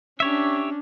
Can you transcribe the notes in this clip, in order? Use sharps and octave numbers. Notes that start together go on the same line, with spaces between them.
C#4 D4 G4 C#5 E5